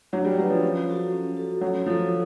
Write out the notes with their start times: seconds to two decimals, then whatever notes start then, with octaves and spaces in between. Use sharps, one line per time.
0.13 F#3 D4
0.25 G3
0.38 F#3 G4 B4
0.50 F3
0.63 C#4
0.87 F#4 A4
1.12 C#4
1.37 F#4 A4
1.61 F#3 C#4
1.86 F3 F#4 A4